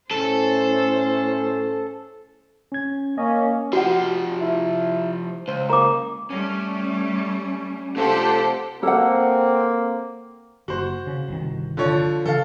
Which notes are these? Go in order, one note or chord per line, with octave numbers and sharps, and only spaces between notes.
A2 C#4 A4 C5
C#4 G#6
A#3 C#4 D#5
F3 F#4 G4 F#5
E4
C#2 C5
A#3 A#5 D6
G3 A3 C#4
C3 A3 D4 F4 G4 A4 C5 F#5
A#3 C4 A4 C5 F#5
F#1 F#4 C5
C#3
G1 C2 D#3
D3 F3 C#5
C#3 E3 A4 F5